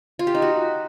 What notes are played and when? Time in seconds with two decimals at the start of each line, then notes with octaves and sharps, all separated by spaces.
0.19 F4
0.27 G4
0.35 D#4
0.42 F#4